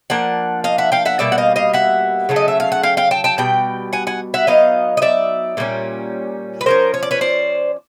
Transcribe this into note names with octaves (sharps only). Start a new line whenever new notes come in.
F3 A#3 D4 F#5
D#5 F5
E5 F#5
F5 G5
E5 F#5
B2 G3 A#3 D5 E5
F#5
D#5 F5
D#5 F5
E5 F#5
C#3 F#3 A3
D#5
E5
F5
F#5
F5 G5
F5 G5
G5 A5
G5 A5
B2 G3 G5
F#5 G#5
F#5 G#5
E5 F#5
F#3 B3 D#4 D#5 F5
D#5
D5 E5
A#2 G3 A#3 C#4
B4
F3 A#3 C#4 A#4 C5
C#5
D5
B4 C#5
C5 D5